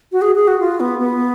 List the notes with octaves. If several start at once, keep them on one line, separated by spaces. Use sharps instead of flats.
F#4
G#4
G#4
F#4
F4
B3
B3